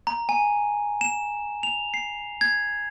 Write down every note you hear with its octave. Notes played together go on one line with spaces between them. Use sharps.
A#5
G#5
E7
F7
C7
G#6